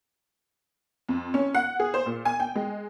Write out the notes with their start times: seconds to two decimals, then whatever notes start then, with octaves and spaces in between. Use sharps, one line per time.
1.09 F2
1.34 C#4
1.54 F#5
1.80 G#4
1.94 C5
2.06 A#2
2.25 G#5
2.40 G5
2.55 G#3